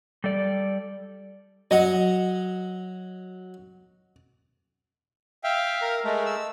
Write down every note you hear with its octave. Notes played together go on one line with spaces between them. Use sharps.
G3 A4 D5
F#3 D#5 F#5
E5 F5 G5
A#4
G#3 A3 A#4
E6